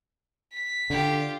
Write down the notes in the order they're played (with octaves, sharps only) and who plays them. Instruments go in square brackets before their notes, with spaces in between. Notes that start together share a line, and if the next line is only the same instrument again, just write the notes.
[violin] B6
[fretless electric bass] D3 [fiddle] F4 G4